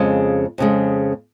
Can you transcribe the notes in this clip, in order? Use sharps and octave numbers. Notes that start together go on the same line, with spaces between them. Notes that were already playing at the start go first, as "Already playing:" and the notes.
Already playing: F2 C#3 G#3
F2 C#3 G#3